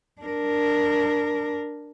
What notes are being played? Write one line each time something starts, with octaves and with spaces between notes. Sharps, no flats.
D4 A#4